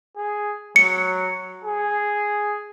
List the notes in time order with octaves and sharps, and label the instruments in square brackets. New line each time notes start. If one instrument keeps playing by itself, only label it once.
[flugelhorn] G#4
[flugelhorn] F#3 [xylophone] C#7
[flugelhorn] G#4